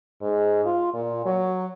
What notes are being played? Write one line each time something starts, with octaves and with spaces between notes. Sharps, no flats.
G#2
F4
A#2
F#3